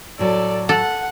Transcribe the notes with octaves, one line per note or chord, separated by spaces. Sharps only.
A2 F#3 A4 D5
A4 F#5